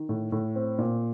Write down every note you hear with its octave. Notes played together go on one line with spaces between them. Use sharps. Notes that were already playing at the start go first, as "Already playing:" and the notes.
Already playing: D#3
A2
A2
C4
A#2